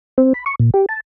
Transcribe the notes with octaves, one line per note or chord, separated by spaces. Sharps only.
C4
B5
C#6
A#2
G4
A5